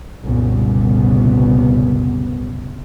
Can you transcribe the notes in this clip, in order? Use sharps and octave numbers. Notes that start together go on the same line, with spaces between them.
F#1 C2 A#2 C#3 B3